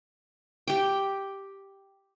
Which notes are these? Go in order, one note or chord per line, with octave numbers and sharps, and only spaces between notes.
G4 G5